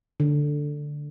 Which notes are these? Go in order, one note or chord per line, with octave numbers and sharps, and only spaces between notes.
D3